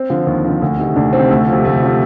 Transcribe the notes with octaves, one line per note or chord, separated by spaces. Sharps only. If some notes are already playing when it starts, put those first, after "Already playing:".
Already playing: C4
D3 F3
D#2
D3 F3
D2
C3 D#3
D2 D4
C3 D#3 C4
D2 A3
C3 F3
D2 A3
C3 F3